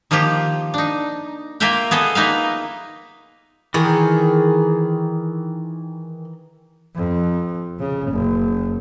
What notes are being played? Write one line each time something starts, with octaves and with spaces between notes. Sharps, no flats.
D#3 F3 A#3 F4 G4
D4 D#4
A#3 F4 A#4 E5 F5 G5
B3 G#4 A4 D#5
A#3 D#4 F4 B4 E5 F5
D#3 E3 G#4
F2
C#3
F#1